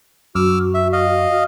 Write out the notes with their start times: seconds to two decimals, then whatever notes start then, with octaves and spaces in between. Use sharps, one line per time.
0.35 F#2 F#4 D6 E6 F6
0.74 E5
0.93 D#5 F5